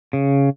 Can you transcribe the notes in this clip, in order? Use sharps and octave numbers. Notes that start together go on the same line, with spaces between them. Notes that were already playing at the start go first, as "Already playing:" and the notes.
C#3